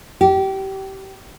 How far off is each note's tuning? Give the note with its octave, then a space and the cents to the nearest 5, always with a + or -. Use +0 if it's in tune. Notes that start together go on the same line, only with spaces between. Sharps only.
G4 -25